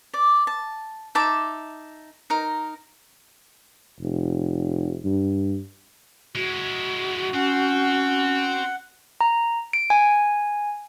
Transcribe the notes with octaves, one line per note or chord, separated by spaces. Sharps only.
D5
A5
D#4 E5 A5 D6
D#4 A#4
F1
G2
G#3 E4 F#4
C4 C#4 F#5
A#5
D7
G#5